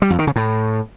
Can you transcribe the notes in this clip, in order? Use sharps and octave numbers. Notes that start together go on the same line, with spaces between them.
G3
F2
D#3
C#3
A2